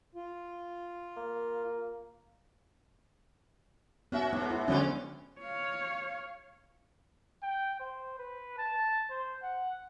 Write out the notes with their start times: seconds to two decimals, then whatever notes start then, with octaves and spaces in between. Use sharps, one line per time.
0.15 F4
1.17 A#3
4.12 B3 C#4 F#4 E5
4.33 G#2 C3 B3
4.50 E4
4.68 D3 F3 G#3 C4 C#4 D5
5.39 C#5 F5
7.43 G5
7.80 C5
8.19 B4
8.58 A5
9.10 C5
9.43 F#5